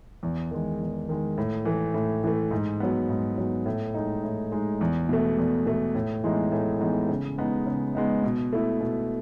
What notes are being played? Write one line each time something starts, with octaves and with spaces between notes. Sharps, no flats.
E2
D#3 G#3
E2
D#3 G#3
A2
E3 A3
A2
E3 A3
G#2
F#3 B3
G#2
F#3 B3
A2
G#3 D#4
A2
G#3 D#4
E2
B2 A3
E2
B2 A3
A2
E3 G#3 B3 D#4
A2
E3 G#3 B3 D#4
C#3
G#3 B3 D#4
C#3
G#3 B3 D#4
B2
A3 E4
B2